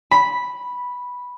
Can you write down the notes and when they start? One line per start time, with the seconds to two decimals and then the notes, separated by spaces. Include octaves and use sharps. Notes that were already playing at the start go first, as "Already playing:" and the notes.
0.11 B5